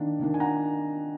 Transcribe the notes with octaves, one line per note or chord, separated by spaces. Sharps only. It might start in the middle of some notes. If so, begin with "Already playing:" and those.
Already playing: D#3 A#3 D4
D#3 A#3 D4
G#5
F#5 A#5